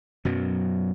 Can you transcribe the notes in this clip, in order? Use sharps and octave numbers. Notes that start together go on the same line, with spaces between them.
F#2 B2 F#3